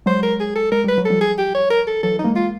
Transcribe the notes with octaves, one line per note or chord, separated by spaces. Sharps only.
F#3 G#3 C5
A#4
G#4
A4
G#3 A#4
G3 B4
F#3
A4
F3 G3
G#4
G4
C#5
A#4
A4
E3 F#3 A4
D#4
G#3 A#3
F4